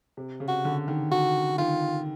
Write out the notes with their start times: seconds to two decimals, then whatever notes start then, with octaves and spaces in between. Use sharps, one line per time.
0.17 C3
0.40 C#3
0.48 F#4
0.65 D3
0.88 D#3
1.11 D3 F#4
1.58 D#3 F4